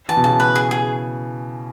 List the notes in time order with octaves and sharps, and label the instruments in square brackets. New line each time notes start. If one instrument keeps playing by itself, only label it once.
[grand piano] E3 [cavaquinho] A5
[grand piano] B2
[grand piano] C#3 [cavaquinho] A5
[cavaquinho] B4
G#4
G#4